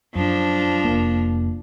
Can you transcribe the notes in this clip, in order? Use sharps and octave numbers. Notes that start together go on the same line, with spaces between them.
F#2 F3 D4
F1 A#3